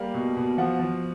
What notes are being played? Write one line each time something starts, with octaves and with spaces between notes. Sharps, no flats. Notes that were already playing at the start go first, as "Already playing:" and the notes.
Already playing: G3 A#3 F5
B2
B2
F3 F#5
F3